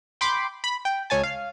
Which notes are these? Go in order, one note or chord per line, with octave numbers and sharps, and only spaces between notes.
G5 B5 C6 D6
B5
G5
C#2 C#5 G#5 A5
F5